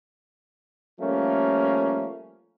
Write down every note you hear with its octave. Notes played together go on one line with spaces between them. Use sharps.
F3 G3 A3 A#3 C#4